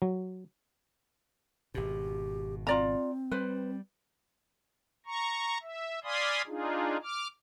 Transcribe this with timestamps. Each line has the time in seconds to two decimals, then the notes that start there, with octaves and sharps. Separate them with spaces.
0.02 F#3
1.75 G#1 B2 G4
2.67 C4 F4 D5 A#5
3.32 G3 B4 C5
5.06 A#5 C#6
5.62 E5
6.04 D5 F5 G#5 B5 C6 D#6
6.47 D4 D#4 F4 G#4
7.03 D6 F6